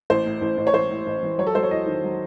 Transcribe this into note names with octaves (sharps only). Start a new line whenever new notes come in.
A1 C5
A2
A1
A1
C#5
A1 C5
A2
A1
E3
F#3 C#5
A4
F#3 C5
C#5
E2 D#5
D#3
F#3